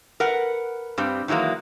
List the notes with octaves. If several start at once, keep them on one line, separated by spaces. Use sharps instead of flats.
A#4 B4 F#5
G2 G3 C4
D#3 E3 F#3 G#3 A#3